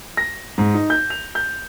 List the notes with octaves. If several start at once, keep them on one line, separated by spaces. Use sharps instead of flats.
A#6
G#2
D#4
G6
F7
G6